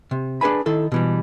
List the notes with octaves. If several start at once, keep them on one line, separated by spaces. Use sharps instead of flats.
C3
D4 G#4 B4 G#5 B5
D#3 E4 A4
B2 E3 G3